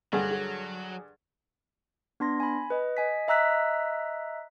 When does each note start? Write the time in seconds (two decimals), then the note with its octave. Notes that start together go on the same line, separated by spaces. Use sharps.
0.13 G2 D3 F#3 G#4
0.31 G#4
2.20 B3 D4 C6 A#6
2.40 G#5 B5
2.70 B4 D#5
2.97 D#5 G#5 B6
3.28 D#5 E5 A#5 E6 F#6 B6